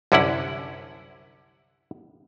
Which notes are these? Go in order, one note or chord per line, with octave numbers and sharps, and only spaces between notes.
C2 F#2 D3 C#4 E4 F#5